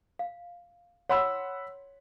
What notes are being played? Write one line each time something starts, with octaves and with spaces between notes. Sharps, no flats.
F5
C#5 F#5 B5 C6 E6